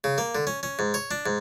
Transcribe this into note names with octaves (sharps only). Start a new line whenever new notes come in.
C#3
A#3
D3
C#4
C#4
G#2
C#5
D4
G#2